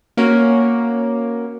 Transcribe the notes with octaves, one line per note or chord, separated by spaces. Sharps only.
A#3 C#4 F#4 A#4